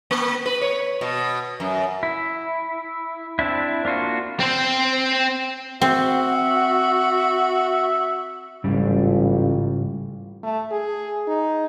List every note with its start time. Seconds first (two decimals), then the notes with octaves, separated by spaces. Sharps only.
0.11 A#3
0.46 B4
0.61 C#5
1.01 B2
1.60 F#2
2.03 E4
3.39 C4 D4 E4
3.85 A#3 D4 F4 F#4
4.40 C4 C5
5.81 C4 F#4 E5 F#5
8.64 A1 G#2 C#3 G3 F4
10.43 A3
10.71 G#4
11.28 D#4